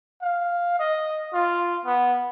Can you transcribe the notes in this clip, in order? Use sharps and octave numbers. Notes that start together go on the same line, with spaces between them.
F5
D#5
F4
B3